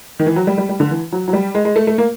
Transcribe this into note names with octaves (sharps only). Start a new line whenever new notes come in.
D#3
E3
F#3
G3
G3
G3
D3
E3
F#3
F#3
G3
G#3
G#3
A3
A3
A#3